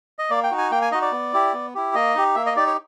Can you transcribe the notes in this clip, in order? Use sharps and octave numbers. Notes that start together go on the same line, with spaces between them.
D#5
A#3 D5
G5
D#4 F#4
G#5
A#3 G5
G#5
D#4 F#4 D#5
D5
B3
E4 G4
B3
E4 G4
A#3 D#5
D#4 G4
A#3 E5
D#5
D#4 G4 D5
C#5